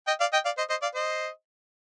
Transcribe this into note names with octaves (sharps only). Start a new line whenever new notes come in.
D#5 G5
D5 F5
D#5 G5
D5 F5
C5 D#5
C5 D#5
D5 F5
C5 D#5